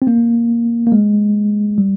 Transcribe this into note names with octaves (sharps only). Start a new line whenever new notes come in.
C4
A#3
A#3
G#3
G3